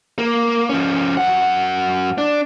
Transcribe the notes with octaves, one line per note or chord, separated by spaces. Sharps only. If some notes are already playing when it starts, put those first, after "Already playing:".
A#3
F3 C#4
F#2 F#5
D4